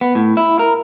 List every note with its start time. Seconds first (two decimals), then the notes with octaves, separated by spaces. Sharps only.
0.01 B3
0.15 A2
0.37 E4
0.59 A#4